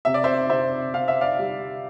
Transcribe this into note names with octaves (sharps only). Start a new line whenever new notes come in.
C3 E5
D5
C5 E5
C3 C5 E5
C4 F5
E5
D5 F5
G3